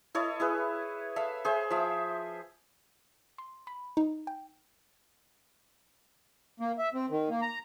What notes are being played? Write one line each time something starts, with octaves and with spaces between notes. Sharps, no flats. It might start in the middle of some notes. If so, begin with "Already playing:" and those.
E4 A4 C#5 D#5
E4 G#4 B4
A4 E5 F5
G#4 C5 E5
F3 E5
C6
B5
D#4
G5
A#3
E5
C4
D#3
A#3
A#5